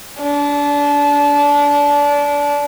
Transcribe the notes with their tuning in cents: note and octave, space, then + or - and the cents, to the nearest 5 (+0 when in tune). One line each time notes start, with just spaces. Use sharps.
D4 -25